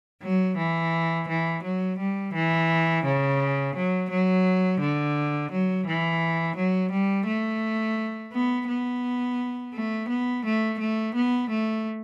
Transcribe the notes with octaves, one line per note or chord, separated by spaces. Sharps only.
F#3
E3
E3
F#3
G3
E3
C#3
F#3
F#3
D3
F#3
E3
F#3
G3
A3
B3
B3
A3
B3
A3
A3
B3
A3